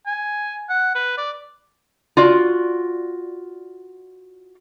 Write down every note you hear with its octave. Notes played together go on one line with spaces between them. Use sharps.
G#5
F#5
B4
D5
F4 F#4 D5